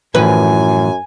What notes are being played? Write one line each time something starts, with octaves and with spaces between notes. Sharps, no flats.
F#2 A2 E3 F3 B4 G#5